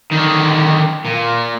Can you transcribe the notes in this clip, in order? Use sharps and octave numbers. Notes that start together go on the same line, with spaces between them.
D3 D#3
A#2